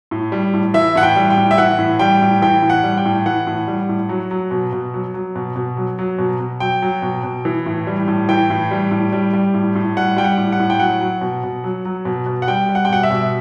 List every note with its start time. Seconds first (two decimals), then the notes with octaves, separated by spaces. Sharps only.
0.11 A2
0.32 G3
0.54 A2
0.74 E3 E5
0.95 A2 F#5
1.03 G5
1.16 G3
1.30 G5
1.37 A2
1.51 E5
1.58 E3 F#5
1.79 A2
1.99 G3 G5
2.22 A2
2.42 E3 G5
2.62 A2
2.70 F#5
2.83 G3
2.97 G5
3.05 A2
3.26 E3 F#5
3.47 A2
3.68 G3
3.89 A2
4.09 F#3
4.31 F#3
4.51 B2
4.72 B2
4.94 F#3
5.14 F#3
5.36 B2
5.56 B2
5.77 F#3
5.99 F#3
6.19 B2
6.40 B2
6.60 F#3 G5
6.82 F#3
7.02 B2
7.24 B2
7.45 E3
7.66 A2
7.87 G3
8.08 A2
8.29 E3 G5
8.50 A2
8.71 G3
8.91 A2
9.12 G3
9.33 G3
9.54 A2
9.75 A2
9.97 G3 F#5
10.17 G3 G5
10.24 F#5
10.38 A2
10.52 F#5
10.60 A2
10.70 G5
10.80 F#3 F#5
11.00 F#3
11.21 B2
11.44 B2
11.64 F#3
11.85 F#3
12.05 B2
12.26 B2
12.42 F#5
12.48 G3 G5
12.69 G3
12.75 F#5
12.85 G5
12.90 B2 F#5
13.03 E5
13.11 B2